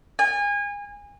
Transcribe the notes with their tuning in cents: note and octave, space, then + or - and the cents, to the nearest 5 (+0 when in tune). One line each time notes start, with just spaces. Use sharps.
G#5 -30